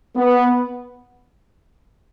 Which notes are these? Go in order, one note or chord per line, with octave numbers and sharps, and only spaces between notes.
B3